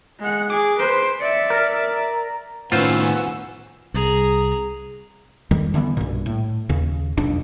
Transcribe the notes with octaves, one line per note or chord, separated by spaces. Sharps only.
G#3 F#5
G#4 D6
B4 C5 D7
D5 E5 C#7
A#4
A2 D#3 B3 C#4 F4 C5 F#5 E6
C2 G#4 A#5
F2 D#3 G3
D3 E3 G#3 B3
B1 G2 A#2
A2
D#2 C#3
E1 B1 F2 D4